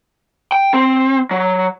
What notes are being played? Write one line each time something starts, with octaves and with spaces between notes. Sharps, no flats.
G5
C4
F#3